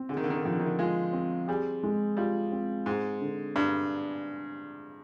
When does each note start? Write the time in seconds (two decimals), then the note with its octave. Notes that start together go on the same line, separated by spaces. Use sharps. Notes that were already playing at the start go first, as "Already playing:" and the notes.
Already playing: C4
0.09 D3 G#4
0.17 D#3
0.24 D3
0.30 D#3
0.37 D3
0.45 D#3 F3
0.52 D3
0.59 D#3
0.66 D3
0.79 G#3 F4
1.13 C4
1.48 G3 G#4
1.83 G#3
2.17 G3 F4
2.52 C4
2.86 G#2 G#4
3.21 D3
3.55 G2 D4